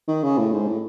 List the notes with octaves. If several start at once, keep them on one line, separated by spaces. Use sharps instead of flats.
D#3
C#3
A2
G#2
A2